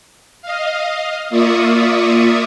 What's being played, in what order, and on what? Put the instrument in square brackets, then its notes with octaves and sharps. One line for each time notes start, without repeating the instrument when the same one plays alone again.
[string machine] D#5 F5
A#3 F4 D5 E5 C#6 D#6